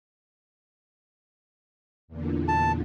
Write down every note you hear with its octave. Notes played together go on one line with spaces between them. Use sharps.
E2 A#2 D3
A5